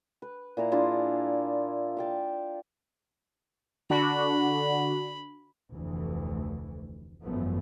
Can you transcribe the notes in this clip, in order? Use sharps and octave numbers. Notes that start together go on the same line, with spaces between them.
B4
A#2 E4 A#5 C6
D4 E4 F4 G#4
F5 G5 A5
D3 D4 F#4 B5
F1 D2 E3
G#1 F#2 E3 F3 A3 B3